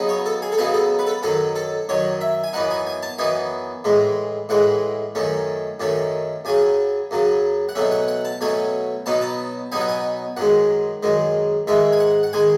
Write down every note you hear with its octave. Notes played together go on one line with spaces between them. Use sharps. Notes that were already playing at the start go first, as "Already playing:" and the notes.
Already playing: C#3 F#3 B3 D#4
C#5
A4
G#4
A4
C#3 F#3 B3 D#4 G#4
A4
B4
A4
F#2 D#3 F#3 A4
A4
F#2 D#3 F#3 C#5
E5
G#5
F#2 E3 B3 D#4 F#5
G#5
G#5
A5
F#2 E3 B3 D#4 G#5
A2 E3 G#3
A2 E3 G#3 F#5
F#2 D#3 A3 C#4
F#2 D#3 A3 C#4
F#2 C#3 F#3 G#5
F#2 C#3 F#3
F#5
B2 F#3 A3 C#4 E5
F#5
F#5
A5
B2 F#3 A3 C#4 G#5
B2 F#3 B3 D#4 A5
A5
B2 F#3 B3 D#4 G#5
F#5
G#5
F#2 D#3 G#3 F#5
F#2 D#3 G#3
G#2 D#3 G#3 E5
G#5
F#5
F#5
D#3 G#3 G#5